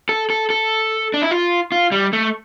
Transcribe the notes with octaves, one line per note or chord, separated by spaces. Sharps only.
A4
A4
A4
D4
E4
F4
F4
G3
A3